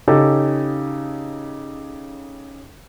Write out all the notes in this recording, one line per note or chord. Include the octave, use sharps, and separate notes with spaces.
C#3 C#4 D#4 G4 A4